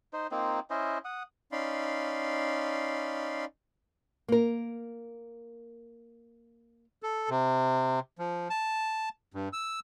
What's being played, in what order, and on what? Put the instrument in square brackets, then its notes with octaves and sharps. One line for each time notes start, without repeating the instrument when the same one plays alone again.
[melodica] D#4 C5
A#3 C4 D#4 F4
C#4 E4 C5 D#5
F#5 D#6
[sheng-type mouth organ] C#4 D#4 D5 F5 B5 C6
[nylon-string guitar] A#3 A#4
[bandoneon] A4
C3
F3
A5
G2
E6